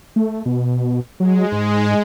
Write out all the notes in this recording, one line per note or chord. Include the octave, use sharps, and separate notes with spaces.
A3
B2
F#3 G#3
G#2